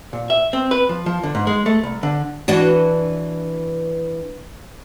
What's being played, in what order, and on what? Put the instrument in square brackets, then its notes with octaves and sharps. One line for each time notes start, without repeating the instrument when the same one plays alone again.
[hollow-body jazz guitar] A#2
E5
C4
B4
F3
F3
D3
G#2
G#3
A3
C2
D3
[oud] E3 D4 F#4